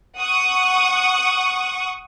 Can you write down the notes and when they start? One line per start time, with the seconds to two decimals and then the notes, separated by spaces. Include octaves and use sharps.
0.20 F#5 C#6 D#6